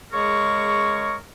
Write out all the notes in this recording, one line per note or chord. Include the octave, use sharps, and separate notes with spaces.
C#3 G#3 G#4 A#4 C#6